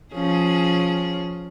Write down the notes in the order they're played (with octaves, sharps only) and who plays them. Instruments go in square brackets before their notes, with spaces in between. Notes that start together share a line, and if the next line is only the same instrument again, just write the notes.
[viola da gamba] F3 C#4 G#4